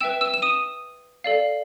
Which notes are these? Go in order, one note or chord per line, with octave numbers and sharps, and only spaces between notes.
B4 E5 G5 E6 E7
E6 E7
E7
D#6 D#7
A4 D5 F5